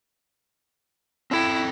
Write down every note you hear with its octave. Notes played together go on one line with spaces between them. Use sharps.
C4 E4 A4 G5